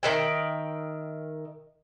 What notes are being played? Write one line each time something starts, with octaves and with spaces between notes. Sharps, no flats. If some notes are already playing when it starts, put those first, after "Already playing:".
D#3 E5 G5